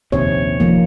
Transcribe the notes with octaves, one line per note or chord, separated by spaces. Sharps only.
A#1 D#2 C3 C#5
F1 D#3 F3 A#3